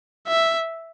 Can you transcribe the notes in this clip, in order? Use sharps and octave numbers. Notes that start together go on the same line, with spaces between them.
E5